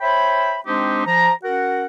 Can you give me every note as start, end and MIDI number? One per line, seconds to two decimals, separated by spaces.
0.01 0.59 72
0.01 0.59 73
0.01 0.59 76
0.01 0.59 79
0.01 0.59 83
0.67 1.03 56
0.67 1.03 60
0.67 1.03 62
0.67 1.03 63
0.67 1.03 67
0.67 1.03 72
1.06 1.32 53
1.06 1.32 82
1.44 1.86 61
1.44 1.86 66
1.44 1.86 70
1.44 1.86 78